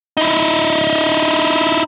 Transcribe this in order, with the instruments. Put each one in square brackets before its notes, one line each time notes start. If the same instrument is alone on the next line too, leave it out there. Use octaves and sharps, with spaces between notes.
[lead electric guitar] D#4 E4